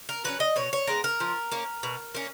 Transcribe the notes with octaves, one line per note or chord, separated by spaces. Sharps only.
A#4
F#3 A#3 C#4 B4
D#5
B2 C#5
C#5
G#3 B3 A#4
A#4
F3
A#3 C#4
B2
A#3 C#4